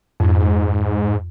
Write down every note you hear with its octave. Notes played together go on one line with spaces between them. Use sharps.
F2 G#2